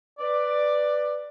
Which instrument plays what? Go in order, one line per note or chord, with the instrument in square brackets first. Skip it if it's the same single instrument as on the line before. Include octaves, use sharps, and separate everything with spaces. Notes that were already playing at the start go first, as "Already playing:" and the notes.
[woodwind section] B4 D5